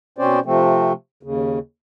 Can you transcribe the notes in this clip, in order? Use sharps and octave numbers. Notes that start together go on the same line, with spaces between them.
B2 C4 C#4 C5 D5
C3 F3 A3 C4
D#2 C#3